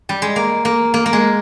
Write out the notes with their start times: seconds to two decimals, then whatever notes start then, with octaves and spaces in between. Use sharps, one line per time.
0.09 G3
0.22 G#3
0.36 A#3
0.65 A#3
0.94 A#3
1.06 A#3
1.13 G#3